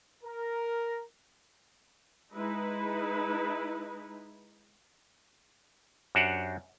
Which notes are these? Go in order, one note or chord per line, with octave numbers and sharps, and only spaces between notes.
A#4
G#3 D#4 E4 B4
F#2 D4 F#4 G4 C5 F#5